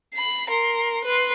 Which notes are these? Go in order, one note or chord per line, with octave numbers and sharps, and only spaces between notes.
B5 C7
A#4 C6
B4 C6